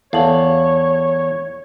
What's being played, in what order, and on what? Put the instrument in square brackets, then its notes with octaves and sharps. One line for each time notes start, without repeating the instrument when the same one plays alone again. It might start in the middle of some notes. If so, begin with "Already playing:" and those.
[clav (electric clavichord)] E2 [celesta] A4 A5 F#7 [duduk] C#5 [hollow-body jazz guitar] F5